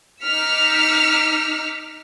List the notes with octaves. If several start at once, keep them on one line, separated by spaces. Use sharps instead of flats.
D#4 D6 E6 F6 B6 C#7